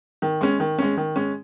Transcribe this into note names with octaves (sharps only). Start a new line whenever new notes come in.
D#3
G#3 C#4
D#3
G#3 C#4
D#3
G#3 C#4